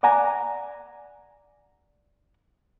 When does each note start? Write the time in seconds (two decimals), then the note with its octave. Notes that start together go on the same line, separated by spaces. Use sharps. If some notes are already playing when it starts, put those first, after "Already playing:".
0.03 D5 F#5 G#5 A#5